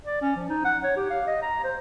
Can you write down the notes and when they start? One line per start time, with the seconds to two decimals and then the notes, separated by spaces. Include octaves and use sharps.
0.05 D5
0.22 C#4
0.36 F3
0.49 D#4
0.65 F#5
0.84 C#5
0.96 G4
1.10 F5
1.27 D#5
1.42 A#5
1.64 C5